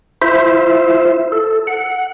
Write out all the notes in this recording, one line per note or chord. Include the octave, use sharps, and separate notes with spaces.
E4 F4 C5 E5
A4
F#5